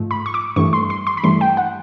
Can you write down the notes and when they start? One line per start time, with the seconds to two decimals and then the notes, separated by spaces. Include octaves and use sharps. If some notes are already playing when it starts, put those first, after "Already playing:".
Already playing: G#2 F3 A3
0.11 B5
0.26 C#6
0.34 D6
0.56 G2 E3 A3 C#6
0.73 C6
0.90 C6
1.07 C6
1.17 B5
1.23 G2 E3 A3 C6
1.41 G5
1.57 F#5